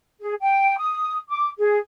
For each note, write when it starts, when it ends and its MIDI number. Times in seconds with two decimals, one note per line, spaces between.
0.20 0.33 68
0.40 0.77 79
0.77 1.16 87
1.28 1.47 86
1.57 1.77 68